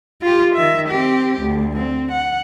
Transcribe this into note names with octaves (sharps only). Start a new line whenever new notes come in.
F4 G4
D#3 E5
C4 G4
D2
C4
F#5